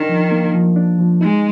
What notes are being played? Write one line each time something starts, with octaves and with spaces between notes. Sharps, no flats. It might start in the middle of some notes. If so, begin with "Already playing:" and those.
Already playing: D#3 D4
F3
A#3
F3
D4
F3
G#3 D#4